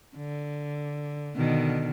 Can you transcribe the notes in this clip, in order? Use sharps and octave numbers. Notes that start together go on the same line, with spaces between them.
D3
B2 D3 D#3